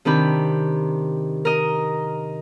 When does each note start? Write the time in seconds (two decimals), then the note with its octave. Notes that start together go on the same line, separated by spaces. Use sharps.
0.05 C3 D#3 D4 G4 B5
1.45 A#4 D#5